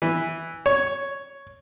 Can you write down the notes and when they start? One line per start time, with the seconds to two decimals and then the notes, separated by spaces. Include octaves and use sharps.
0.02 E3
0.66 C#5